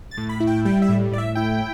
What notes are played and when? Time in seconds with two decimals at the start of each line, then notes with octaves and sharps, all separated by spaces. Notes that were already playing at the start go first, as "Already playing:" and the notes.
0.11 A6
0.17 A2
0.29 B5
0.40 E4
0.47 G5
0.65 G3 G5
0.82 E5
0.89 A2
1.12 A2 D5
1.18 E5
1.35 E4 G5